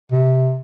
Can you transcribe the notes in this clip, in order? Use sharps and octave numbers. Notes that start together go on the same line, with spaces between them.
C3